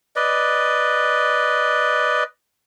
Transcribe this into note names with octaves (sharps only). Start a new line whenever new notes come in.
B4 D5 D#5